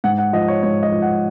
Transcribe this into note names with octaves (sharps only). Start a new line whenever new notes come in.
G#2 F#5
F#5
F3 D#5
C#5
G#2 C#5
D#5
F3
F#5